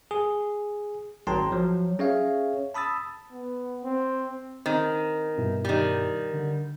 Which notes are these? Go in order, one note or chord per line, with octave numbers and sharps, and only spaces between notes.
G#4
G#1 F#3 G5 A5 A#5 C6
F3 F#3
C#4 G#4 C#5 E5 F5
A5 B5 D#6 E6 A6
B3
C4
D#3 C4
G2 B2 E4
D#3 G3
D3